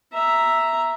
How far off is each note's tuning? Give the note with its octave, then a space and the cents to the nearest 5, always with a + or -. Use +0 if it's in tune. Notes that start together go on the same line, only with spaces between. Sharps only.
E5 +0 A#5 +0